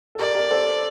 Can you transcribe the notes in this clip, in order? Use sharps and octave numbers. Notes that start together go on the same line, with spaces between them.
A4
G4 A#4 D5
G4 A#4
A4 C5